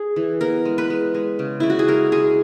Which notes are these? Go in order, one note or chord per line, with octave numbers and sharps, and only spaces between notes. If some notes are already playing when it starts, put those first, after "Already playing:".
Already playing: G#4
E3
B3 A#4
G#3
B4
G#3
G#3
C#3
C#3 E4
F#4
G#4
G#3 A#4
G#3 G#4